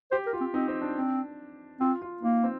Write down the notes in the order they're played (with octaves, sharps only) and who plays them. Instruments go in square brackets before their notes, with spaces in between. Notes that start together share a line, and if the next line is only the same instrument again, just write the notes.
[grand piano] G4 [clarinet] C5
[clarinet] A#4
[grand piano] F4
[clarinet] C4
[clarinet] C4 [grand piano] D#4
[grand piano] C4
D4
[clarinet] C4
[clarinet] C4 [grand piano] F4
[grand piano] F4
[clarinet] A#3 [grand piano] D#4
[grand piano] C4